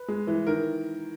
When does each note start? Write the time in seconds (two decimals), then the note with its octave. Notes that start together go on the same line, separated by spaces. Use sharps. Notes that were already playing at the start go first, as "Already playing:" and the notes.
Already playing: B4
0.08 G#3
0.27 E3
0.47 D#3 A#4